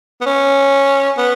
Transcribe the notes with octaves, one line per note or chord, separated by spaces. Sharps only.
B3
C#4
B3